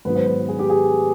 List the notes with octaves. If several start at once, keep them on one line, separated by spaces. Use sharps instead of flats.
G#2 D#3 F#3 B3 B4
C5
B4
G#4
G4
G#4